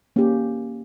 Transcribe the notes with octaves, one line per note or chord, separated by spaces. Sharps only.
A#3 C#4 G4